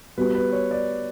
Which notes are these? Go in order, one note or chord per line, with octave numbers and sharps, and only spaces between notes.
G3 B3 F#4 B4
B4
C#5
D5